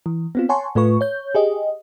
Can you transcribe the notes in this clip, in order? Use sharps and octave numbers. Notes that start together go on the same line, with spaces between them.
E3
B3 C4 F4
C#5 F#5 G#5 A5 C6 C#6
A2 A3 F4 B4 C#6
C#5 G6
G4 G#4 D#5